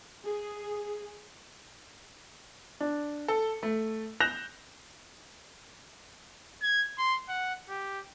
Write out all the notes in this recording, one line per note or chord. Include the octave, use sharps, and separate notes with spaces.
G#4
D4
A4
A3
F#6 G6 A#6 E7 F7
G#6
C6
F#5
G4